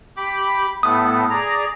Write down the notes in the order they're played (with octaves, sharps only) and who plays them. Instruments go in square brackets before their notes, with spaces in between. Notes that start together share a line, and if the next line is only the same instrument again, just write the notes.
[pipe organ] G4 B5 D6
[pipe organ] A2 A3 B3 [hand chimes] D#6
[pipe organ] G#4 D5 A#5